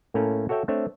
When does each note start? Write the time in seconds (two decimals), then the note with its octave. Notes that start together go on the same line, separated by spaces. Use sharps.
0.14 A2 A3 A#3 C#4 A#5
0.49 F#4 A4 C#5 E5 G5
0.68 A3 C4 D4 C#5 E5